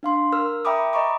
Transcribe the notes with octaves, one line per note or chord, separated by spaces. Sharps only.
D4 F5 C6
A#4 E6 F6
E5 G5 A#5 B5 D6 D#6
D#5 A#5 B5 C#6 D6